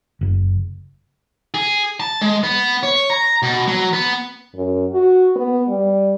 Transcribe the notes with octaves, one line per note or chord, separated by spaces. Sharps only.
F#1
G#4
A5
G#3
B3
C#5
A#5
B2
F#3
B3
F#2
F#4
B3
G3